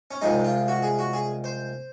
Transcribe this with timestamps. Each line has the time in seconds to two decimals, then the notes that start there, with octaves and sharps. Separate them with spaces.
0.11 C#4
0.21 C2 C3 F3 G#3 D#4
0.45 F4
0.68 F#4
0.83 G#4
0.99 F#4
1.13 G#4
1.44 C5